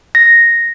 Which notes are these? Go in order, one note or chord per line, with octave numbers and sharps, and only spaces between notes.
A#6